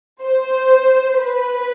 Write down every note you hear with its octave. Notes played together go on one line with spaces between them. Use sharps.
C5
B4